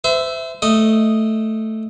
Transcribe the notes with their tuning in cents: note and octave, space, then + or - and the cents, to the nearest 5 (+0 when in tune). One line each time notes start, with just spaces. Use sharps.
C5 -35 E5 +0
A3 +0 D#5 +0